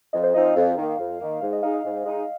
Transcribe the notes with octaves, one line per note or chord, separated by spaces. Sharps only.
F2 D#5
C5
F3 C4 D#4 D#5
F5
F2
D#3 A#3
F2
D#3 A#3
G#2 F5
D#5
G#3 D#4 F5
D#5
G#2
G#3 D#4